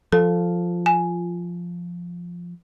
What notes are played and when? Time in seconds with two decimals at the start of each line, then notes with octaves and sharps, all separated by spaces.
0.12 F3 A4
0.86 G#5